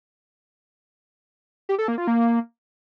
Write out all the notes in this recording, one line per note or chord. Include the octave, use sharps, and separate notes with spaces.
G4
A4
A#3
F4
A#3